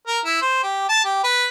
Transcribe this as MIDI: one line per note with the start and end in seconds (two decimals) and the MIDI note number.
0.07 0.19 70
0.25 0.38 64
0.42 0.62 72
0.63 0.88 67
0.89 1.01 81
1.04 1.20 67
1.24 1.46 71